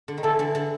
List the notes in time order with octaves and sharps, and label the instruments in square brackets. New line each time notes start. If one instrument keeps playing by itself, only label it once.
[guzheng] D3
D#3
[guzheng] D3 E3 [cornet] A4
[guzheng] D3 E3
D3